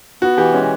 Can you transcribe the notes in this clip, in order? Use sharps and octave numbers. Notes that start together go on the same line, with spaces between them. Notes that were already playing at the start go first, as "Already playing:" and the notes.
B3 F#4
E3 G4
G#3 C#4